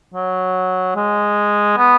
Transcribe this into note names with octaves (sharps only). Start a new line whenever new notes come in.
F#3
G#3
B3